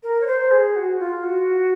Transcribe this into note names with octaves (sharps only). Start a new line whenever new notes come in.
A#4
C#5
C5
G#4
F#4
F4
F#4